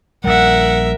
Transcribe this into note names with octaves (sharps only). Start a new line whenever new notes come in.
A#1 G3 A#4 E5 F#5